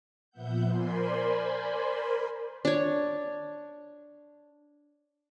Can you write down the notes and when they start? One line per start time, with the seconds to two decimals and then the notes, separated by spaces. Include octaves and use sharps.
0.31 A#2 F3 B3 E5 F#5 G6
0.68 A#4 C5 D5 G#5 B5 C6
2.65 D4 C#5